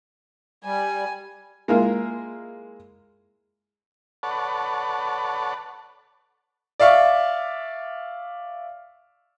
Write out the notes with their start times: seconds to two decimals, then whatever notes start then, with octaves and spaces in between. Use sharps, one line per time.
0.64 G3 G#5
1.68 G#3 A#3 E4 F4 A#4
4.23 A4 B4 C#5 D5 F#5 A5
6.80 D5 E5 F5 C#6 D6